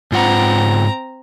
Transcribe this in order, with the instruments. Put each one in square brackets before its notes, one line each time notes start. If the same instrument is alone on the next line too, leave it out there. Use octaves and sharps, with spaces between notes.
[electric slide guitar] G#2 F4 F#5 [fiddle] C4 A#5